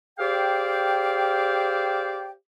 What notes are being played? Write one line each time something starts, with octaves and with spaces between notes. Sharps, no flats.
G4 G#4 C5 D5 F5 G5